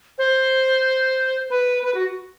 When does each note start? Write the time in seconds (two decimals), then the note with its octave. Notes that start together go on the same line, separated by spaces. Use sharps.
0.18 C5
1.50 B4
1.83 B4
1.94 F#4